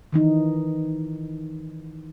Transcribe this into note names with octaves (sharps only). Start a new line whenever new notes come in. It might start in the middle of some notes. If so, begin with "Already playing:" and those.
D#3 E3 D#4